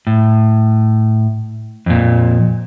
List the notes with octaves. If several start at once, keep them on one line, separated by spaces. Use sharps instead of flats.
A2
F2 A#2